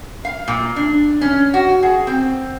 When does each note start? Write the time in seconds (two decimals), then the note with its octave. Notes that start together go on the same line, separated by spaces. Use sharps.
0.25 F5
0.48 A#2
0.76 D4
1.21 C#4
1.54 F#4
1.83 G#4
2.07 C4